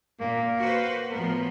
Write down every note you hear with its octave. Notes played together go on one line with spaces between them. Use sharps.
A#2 A#3
F#4 B4 C5
A2 F3 B3 A#4